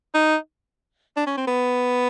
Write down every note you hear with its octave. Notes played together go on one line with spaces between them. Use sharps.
D#4
D4
C#4
C4
B3